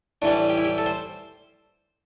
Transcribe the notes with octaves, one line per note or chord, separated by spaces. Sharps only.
A2 E3 G3 D4
G4
E4
G4
A4
C5